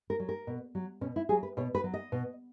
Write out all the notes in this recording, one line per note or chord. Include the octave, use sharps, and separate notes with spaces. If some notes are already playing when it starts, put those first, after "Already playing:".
A#4
F#3
A#4
B2
F#3
B2 C#4
E4
F#3 G#4
B4
B2 C#5
B4
F#3
D#5
B2